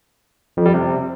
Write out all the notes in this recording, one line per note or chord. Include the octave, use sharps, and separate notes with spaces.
F2
G3
C3